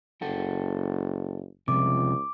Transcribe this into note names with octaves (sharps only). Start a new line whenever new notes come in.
F#1 A4 F#5 G5
C#2 C3 F3 G3 D6